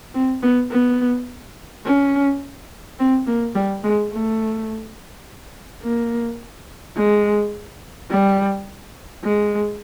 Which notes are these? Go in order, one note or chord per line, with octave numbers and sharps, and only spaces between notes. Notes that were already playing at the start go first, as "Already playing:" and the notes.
C4
B3
B3
C#4
C4
A#3
G3
G#3
A3
A#3
G#3
G3
G#3